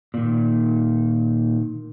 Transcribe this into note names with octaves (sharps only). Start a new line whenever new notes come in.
A#2 D#3